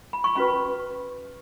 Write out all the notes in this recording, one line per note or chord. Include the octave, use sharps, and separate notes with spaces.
B5
C#6
C#4 F#4 B4 B5